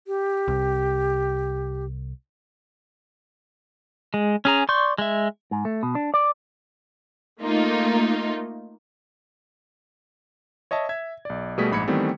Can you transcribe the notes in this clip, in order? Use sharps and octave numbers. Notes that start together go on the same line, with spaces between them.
G4
C2
G#3
C#4 G#4 A#5
D5 C6 C#6 G6
G#3 E5
G#2
A3
B2
D4
D5
A3 A#3 D#4 F4
C#5 D#5 E5 A5
E5 G#6
B1 D5
B2 G3 A3 G#4 B6
A#1 G#2 B5 G#6 C#7
D#3 E3 G3 A3 B3 C4